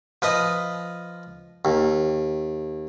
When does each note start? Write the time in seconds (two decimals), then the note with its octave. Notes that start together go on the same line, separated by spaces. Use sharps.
0.22 F3 B4 D#5
1.65 D#2